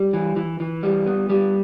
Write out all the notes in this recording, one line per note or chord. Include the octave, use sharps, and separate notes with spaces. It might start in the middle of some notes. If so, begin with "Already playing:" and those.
Already playing: G3
E3
E3
E3
G3
B3
G3